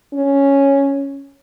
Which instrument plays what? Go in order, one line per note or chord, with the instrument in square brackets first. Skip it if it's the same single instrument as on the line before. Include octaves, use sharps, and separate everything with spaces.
[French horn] C#4